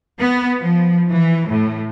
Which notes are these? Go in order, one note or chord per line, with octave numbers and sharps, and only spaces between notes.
B3
F3
E3
A2